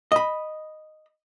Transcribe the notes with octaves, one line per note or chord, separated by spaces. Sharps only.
D#5 B5